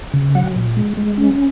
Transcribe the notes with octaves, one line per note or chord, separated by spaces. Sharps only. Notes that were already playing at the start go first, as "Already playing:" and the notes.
C#3
F#3 F#5
A#2
G#3
G#3
C#4